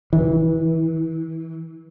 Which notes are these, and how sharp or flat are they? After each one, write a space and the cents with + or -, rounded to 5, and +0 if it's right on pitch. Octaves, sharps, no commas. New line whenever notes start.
E3 -25